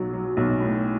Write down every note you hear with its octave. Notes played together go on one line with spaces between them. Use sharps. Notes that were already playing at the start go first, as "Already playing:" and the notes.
Already playing: B1 F#3
F#3
B1
A2